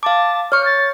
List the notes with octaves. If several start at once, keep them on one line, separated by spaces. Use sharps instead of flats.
F5 A5 D6
C#5 C#6 F6
A6